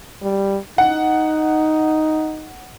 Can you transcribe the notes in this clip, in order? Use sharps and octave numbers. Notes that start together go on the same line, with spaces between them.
G3
D#4 F#5